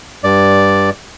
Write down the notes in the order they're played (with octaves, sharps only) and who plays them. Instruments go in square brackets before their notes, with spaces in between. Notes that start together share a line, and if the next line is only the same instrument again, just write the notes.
[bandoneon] G2 D5